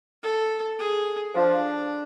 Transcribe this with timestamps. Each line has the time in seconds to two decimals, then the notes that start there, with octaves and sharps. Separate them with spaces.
0.23 A4
0.79 G#4
1.35 F3 D4